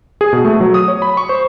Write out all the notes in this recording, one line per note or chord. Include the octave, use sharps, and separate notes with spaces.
G#4
B2
A3
F#3
D#6
C#5
B5
C#6
C5